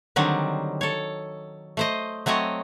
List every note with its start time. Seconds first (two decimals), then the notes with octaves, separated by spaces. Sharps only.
0.16 D3 D#3 F#3 G3 C4
0.81 A4 C#5
1.77 A3 C5 D#5
2.26 F#3 A3 C4 C#5 D#5